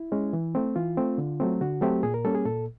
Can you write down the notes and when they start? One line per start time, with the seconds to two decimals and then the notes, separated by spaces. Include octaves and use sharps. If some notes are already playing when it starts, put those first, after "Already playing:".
Already playing: E4
0.12 G#3 C#4
0.33 E3
0.55 A3 C4
0.76 E3 F4
0.97 A3 C4
1.18 D3
1.40 F#3 A3 C4
1.61 D3 F#4
1.81 F#3 A3 C4 G4
2.03 A#2 G#4
2.14 A#4
2.25 G3 A#3 C#4 A4
2.35 G#4
2.45 A#2 A4